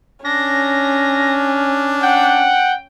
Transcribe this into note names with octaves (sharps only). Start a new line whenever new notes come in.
C#4 D4 A#6
F#5 G5